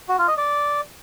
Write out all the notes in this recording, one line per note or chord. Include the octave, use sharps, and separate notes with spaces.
F#4
F4
D#5
D5